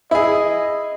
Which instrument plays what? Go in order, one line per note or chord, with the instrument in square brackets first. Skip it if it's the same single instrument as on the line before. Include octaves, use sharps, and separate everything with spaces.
[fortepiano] E4 G#4 [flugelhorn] D#5